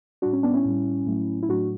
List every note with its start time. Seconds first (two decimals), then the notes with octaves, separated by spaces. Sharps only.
0.22 A2 G3 D4 F#4
0.33 C#4
0.43 B3 D4
0.53 C#4 E4
0.65 A2 G3
1.06 A2 F#3 A3
1.43 E4
1.49 A2 F#3 A3 D4 F#4